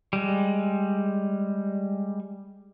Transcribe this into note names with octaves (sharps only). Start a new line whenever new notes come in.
G3 G#3